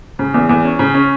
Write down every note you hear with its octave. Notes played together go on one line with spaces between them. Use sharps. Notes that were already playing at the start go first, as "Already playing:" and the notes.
C#3
E2
E2
C#4
C#3
C#4